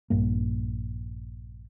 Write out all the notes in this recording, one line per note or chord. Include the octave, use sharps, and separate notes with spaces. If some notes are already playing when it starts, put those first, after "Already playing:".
A#1 G2 A#3